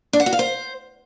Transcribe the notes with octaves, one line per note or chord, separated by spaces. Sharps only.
D4
F#5
F#4
F5
C5